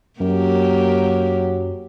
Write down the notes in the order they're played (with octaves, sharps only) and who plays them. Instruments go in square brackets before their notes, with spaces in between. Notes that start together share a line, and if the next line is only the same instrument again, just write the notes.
[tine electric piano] F#2 [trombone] F#3 [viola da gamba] A#3 G4